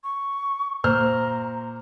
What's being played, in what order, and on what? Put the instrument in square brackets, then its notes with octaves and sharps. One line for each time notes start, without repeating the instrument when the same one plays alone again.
[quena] C#6
[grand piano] A#2 C5 F6 [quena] A#5